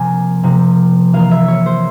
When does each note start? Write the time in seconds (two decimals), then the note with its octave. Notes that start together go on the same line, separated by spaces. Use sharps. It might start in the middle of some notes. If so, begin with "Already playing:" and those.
Already playing: C3 F3 A#3 G#5
0.43 C3 F3 A#3
1.13 E3 A#3 F5
1.31 E5
1.48 C#5
1.66 C5